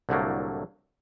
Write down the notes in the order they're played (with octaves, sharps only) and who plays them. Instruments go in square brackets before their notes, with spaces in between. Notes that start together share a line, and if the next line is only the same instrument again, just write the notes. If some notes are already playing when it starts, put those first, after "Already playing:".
[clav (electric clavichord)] C2 A2 D3 F#3 A3 A#3